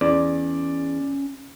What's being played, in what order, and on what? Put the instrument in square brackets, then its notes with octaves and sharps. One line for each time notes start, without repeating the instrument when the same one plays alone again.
[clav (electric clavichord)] E2 [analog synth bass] C#4 [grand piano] D5